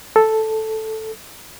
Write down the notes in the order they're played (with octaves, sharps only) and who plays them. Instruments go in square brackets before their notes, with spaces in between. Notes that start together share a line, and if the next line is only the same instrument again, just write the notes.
[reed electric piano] A4